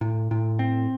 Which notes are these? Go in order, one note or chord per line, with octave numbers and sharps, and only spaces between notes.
A2
A2
C4